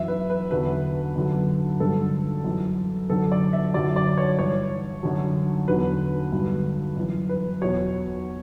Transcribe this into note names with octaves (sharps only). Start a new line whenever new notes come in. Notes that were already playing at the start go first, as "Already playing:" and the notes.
Already playing: F#2 E3 E5
B4
B4
E2 D3 F#3 B4
F#2 D3 F#3
G2 D3 F#3 A4
F#2 E3
F#2 D3 F#3 A4
D5
E5
F#2 D3 F#3 D5
D5
C#5
G2 E3 C#5
F#2 D3 F#3
E2 D3 F#3 B4
G2 D3 F#3
F#2 E3
B4
E2 B2 F#3 C#5